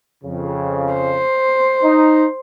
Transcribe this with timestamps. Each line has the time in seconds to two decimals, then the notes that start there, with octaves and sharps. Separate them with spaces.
0.24 F2 C#3
0.94 C5
1.83 D#4